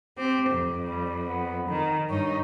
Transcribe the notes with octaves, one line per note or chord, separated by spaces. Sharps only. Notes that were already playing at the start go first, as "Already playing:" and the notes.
C4 G4
F2
G3
B3
D#3 A#4
G2 D#4 C#5